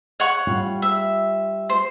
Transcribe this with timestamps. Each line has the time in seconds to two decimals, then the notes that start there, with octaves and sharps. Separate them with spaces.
0.20 C#5 F#5 C#6
0.47 G3 F4
0.82 E5
1.69 C5